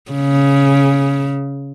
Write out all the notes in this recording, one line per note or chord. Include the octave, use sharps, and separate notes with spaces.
C#3